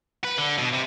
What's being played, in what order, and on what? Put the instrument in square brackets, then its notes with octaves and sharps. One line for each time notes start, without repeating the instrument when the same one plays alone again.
[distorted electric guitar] B4
D3
B2
C3